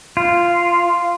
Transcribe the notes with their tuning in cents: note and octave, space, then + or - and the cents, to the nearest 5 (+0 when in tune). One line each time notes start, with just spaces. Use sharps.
F4 -10